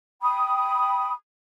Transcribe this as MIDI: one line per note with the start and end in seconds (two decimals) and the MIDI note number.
0.22 1.12 79
0.22 1.12 83
0.22 1.12 87